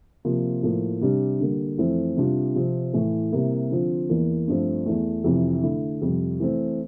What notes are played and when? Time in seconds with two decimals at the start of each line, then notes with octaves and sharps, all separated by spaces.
0.25 C3 F3 A#3 F4
0.63 A2 F3 A#3
1.01 C3 G3 D4
1.40 D3 G3 A#3
1.78 F2 E3 A3 C4 E4
2.17 C3 G3 D4 F4
2.55 C3 F3 C4
2.94 A2 E3 A3
3.32 C3 G3 A#3 E4
3.71 D3 F3 C4 F4
4.09 E2 E3 A#3
4.48 G2 F3 A3 C4 F4
4.86 E2 E3 A3
5.24 F2 C3 E3
5.63 D3 A3 E4
6.02 F2 C3 G3
6.40 E3 A3 C4